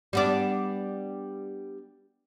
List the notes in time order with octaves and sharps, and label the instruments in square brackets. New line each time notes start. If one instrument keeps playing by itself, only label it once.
[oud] G3 B3 D4